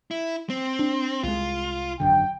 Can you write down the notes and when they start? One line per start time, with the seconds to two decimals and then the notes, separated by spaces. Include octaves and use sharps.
0.11 E4
0.50 C4
0.79 D4
1.23 C2 G3 G#3 F4
2.00 G#1 F#2 D3 G5